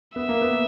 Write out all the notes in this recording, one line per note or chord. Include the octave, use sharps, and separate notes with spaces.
B3 E5
A#3
B3